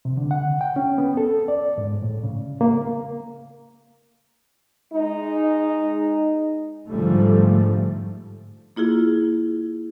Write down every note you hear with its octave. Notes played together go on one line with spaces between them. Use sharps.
C3
D3
F#5
G5
C#4
B3
A4
D5
G#2
A2
C#3
A#3
G#3 D#4
G#2 D3 F3 G3 A3
A#3 E4 F4 G#4